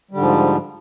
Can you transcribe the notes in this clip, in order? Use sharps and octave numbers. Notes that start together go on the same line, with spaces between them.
G#2 D3 F3 G3